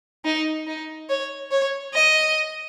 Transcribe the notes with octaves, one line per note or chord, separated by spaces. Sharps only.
D#4
D#4
C#5
C#5
D#5